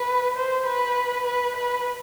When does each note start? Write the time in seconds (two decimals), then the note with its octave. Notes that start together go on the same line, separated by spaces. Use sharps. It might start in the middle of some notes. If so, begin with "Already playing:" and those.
Already playing: B4
0.36 C5
0.66 B4
1.25 B4
1.56 B4